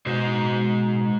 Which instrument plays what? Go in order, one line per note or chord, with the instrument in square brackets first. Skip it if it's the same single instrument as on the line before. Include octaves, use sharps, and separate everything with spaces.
[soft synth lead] B2 [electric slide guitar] G#3 C5 D#5